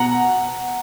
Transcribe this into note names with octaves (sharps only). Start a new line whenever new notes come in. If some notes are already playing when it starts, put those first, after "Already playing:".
Already playing: B2 F#5 A#5